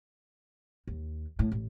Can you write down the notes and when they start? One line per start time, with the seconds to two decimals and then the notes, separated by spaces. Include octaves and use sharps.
0.87 D#2
1.39 A2
1.52 A1